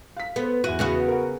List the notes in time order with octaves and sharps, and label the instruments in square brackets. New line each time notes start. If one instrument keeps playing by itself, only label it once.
[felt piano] F5 B6
[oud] B3 [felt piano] A4 C5
[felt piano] E2 E4 D#7 [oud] F#4
[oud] C#3 B3 F#4
[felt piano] A#4 F#5